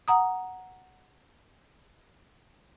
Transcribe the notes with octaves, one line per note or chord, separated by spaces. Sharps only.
F#5 A#5 D#6